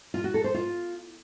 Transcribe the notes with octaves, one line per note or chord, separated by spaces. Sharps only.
F4
F#4
A4
C5
F4